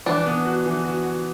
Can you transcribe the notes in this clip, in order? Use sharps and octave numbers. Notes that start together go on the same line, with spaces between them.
E3 D4
B3
F#4
E3
F#4
F#4